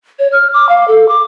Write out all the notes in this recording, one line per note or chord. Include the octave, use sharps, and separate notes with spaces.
C#5
F6
D6
F5
A4
D6